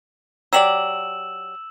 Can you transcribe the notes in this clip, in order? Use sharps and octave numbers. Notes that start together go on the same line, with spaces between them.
F#3 G4 D5 E6 E7 F#7